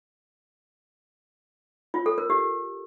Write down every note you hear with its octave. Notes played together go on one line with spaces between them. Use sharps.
F4
A4
A#4
G4